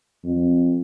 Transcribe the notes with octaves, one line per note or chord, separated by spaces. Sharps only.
F2